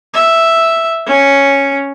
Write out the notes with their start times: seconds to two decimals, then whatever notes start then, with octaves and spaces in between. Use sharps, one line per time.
0.14 E5
1.06 C#4